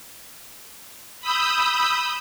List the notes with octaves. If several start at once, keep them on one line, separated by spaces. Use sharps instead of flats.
B5 D#6 E6 G6